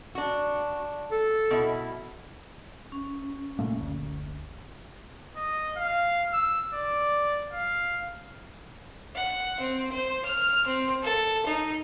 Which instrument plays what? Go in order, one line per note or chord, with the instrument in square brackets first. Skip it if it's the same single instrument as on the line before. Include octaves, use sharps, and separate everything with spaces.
[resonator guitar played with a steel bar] D4 F#4
[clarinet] A4
[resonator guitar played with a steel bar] B2 E4
[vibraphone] C#4
[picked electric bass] A#2 A3 A#3
F#1 D2
[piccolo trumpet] D#5
F5
E6
D5
F5
[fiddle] F#5
C4
C5
F6
C4
A4
D#4